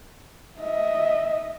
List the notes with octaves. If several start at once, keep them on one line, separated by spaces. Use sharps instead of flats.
D#5 E5